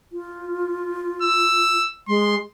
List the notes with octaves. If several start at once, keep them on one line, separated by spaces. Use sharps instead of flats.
F4
E6
G#3 C6